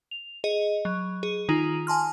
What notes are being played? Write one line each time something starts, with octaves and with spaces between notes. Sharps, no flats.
F7
G#4 D#5
F#3
G#4
D#3 D#4 F4 F#7
G#5 A5 C6 F6